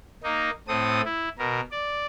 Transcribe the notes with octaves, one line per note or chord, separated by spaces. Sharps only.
A#3 D#4
A2 C4 A4 D#6
E4
B2 A#4
D5